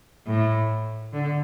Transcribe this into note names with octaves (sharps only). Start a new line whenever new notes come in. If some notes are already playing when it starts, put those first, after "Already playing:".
A2
D3